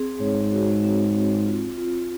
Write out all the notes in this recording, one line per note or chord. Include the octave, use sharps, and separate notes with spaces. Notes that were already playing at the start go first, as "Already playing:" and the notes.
Already playing: C4 G#4
G#2 C#5
F#4
C4
C4
F4
F4